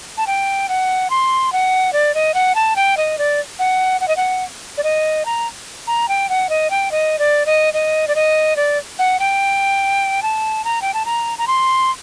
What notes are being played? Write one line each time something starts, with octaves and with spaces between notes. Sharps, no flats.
A5
G5
F#5
C6
F#5
D5
D#5
F#5
A5
G5
D#5
D5
F#5
F#5
D#5
F#5
D5
D#5
A#5
A#5
G5
F#5
D#5
G5
D#5
D5
D#5
D#5
D5
D#5
D5
F#5
G5
A5
A#5
G5
A5
A#5
A#5
C6